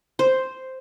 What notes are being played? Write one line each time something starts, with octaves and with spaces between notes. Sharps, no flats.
C5